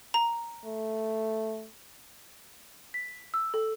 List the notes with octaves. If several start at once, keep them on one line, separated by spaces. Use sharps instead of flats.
A#5
A3
B6
E6
A4